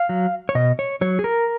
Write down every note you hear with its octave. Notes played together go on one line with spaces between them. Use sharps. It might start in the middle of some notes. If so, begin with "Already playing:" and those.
Already playing: F5
F#3
C#5
B2 D#5
C#5
F#3 C#5
G#4
A#4